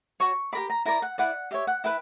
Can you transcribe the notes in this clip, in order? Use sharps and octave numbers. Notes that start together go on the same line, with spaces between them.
F#4 C#5 C#6
G4 A#4 D5 B5
A#5
E4 A#4 D5 A#5
F#5
E4 B4 D5 F#5
G4 C#5 E5
F#5
E4 B4 G5